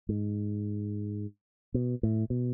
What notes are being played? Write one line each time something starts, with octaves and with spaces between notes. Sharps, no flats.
G#2
B2
A2
B2